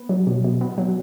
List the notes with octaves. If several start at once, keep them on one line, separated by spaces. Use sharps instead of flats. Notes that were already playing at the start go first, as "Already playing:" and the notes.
Already playing: B3
F#3
B2
B2
B3
F#3